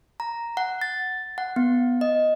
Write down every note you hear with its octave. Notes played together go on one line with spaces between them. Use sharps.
A#5
F#5
A6
F#5
B3
D#5